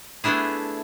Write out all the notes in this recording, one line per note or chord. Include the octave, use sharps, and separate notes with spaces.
A3 B3 D4 E4 G#4